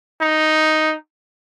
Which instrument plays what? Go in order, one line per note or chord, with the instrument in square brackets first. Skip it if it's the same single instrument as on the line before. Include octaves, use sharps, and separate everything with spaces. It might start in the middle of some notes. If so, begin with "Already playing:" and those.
[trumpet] D#4